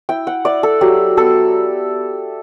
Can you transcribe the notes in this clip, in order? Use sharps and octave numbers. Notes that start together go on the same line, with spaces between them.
E4 G5
F#5
E4 D5
A4
F#3 G4
B3 A4